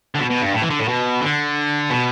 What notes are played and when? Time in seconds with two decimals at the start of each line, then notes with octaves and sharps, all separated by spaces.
0.15 D3
0.20 B2
0.30 B2
0.42 G2
0.54 A2
0.62 E3
0.70 D3
0.80 A2
0.88 B2
1.21 D3
1.90 B2